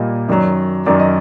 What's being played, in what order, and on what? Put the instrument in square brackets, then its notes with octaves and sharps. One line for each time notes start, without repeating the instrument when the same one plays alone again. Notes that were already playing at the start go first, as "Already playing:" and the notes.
Already playing: [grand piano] A#2 G3 A#3 [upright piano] D#5
[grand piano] F#2 D#3 F#3 [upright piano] D5
[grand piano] F#2 D#3 F#3 [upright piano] D5
[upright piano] D#5